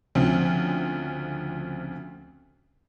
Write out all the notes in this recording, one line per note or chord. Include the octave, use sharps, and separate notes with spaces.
D2 C#3 F3 C4